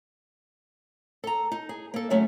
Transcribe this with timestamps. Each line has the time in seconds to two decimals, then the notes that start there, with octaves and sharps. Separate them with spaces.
1.24 A4 A#5
1.52 D#4
1.69 G#4
1.94 A#3 A4
2.10 C#3 F#3 A3 C#4